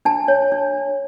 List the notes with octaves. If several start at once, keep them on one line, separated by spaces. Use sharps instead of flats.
D4 A5
C#5
D4